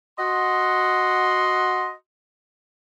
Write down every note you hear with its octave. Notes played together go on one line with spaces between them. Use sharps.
F#4 D#5 F#5 C6